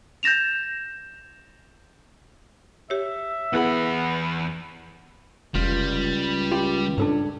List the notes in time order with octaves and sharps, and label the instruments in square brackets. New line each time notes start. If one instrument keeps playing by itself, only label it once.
[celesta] G6 A6 A#6 E7 F7
[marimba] G4 C#5 [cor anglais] E5
[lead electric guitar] E2 B5 [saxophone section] B3 [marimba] E4 G#4 F#5
[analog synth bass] F1 [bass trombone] C#2 [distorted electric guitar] G3 [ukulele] F4
[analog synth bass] F4 [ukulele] G4
[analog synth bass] G#2 [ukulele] D4 A4 C#5